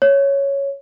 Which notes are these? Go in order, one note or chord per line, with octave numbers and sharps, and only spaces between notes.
C#5